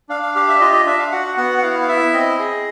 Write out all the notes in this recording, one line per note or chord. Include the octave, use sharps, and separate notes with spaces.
D4 F5
F5
G4 F5
E5
F4 D#5
D#5
D4 E5
F5
F#4 F#5
B3 F#5
F#5
E4 F5
F5
E4 E5
C4 D#5
G#4